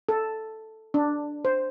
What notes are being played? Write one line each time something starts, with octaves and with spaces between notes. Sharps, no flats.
A4
D4
C5